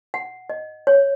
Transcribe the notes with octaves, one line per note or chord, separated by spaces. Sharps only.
F#5
D#5
C#5